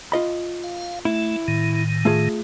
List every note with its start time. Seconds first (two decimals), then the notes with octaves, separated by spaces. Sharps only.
0.12 F4 D#5 B5
0.64 F5
1.05 A3 E4
1.48 A2 D#3
2.05 A3 F4 G#4